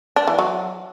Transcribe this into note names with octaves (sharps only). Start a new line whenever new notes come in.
D4
E3
F#3